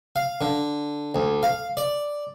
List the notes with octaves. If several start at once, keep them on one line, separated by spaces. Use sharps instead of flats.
F5
D3
D2
F5
D5